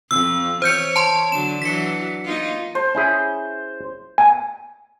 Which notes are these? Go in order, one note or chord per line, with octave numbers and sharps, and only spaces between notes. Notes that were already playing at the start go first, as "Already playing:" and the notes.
F2 E6
E3 C5 C#5 G6 C#7
A5 C6
D3 F#3 D4 E7
E3 F#3 D4 B6 C#7
A#3 D#4 F4
C5
C#4 E4 G#4
G#5